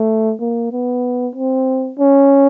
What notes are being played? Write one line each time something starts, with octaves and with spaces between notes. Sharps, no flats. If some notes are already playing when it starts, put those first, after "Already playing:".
Already playing: A3
A#3
B3
C4
C#4